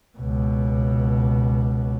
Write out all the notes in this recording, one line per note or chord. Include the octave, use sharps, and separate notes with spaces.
C#2 B2